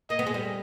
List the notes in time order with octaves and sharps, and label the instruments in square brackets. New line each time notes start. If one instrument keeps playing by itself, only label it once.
[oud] A#3 [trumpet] D#5
[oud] B3
G#3
G3